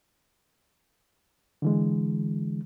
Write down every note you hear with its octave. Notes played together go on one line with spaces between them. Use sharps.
D3 E3 G#3